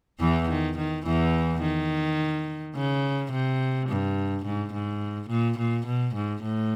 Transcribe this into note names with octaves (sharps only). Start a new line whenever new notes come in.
E2 E3
D#3
D#3
E2 E3
D#3
C#3
C3
G2
G#2
G#2
A#2
A#2
B2
G#2
A2